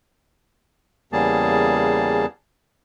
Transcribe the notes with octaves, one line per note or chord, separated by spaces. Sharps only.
E2 C#3 G3 A#3 G#4 A5